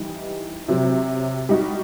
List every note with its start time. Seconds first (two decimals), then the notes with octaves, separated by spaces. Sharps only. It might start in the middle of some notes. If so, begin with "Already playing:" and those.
Already playing: E3 G3 D#4
0.68 C3 F#3 C4
1.49 G3 D#4 F#4